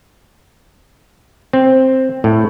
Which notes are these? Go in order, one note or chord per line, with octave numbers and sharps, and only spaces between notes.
C4
A2